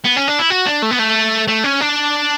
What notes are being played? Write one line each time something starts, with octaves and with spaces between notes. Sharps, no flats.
B3
C#4
D4
E4
F#4
D4
A3
B3
A3
A3
C#4
D4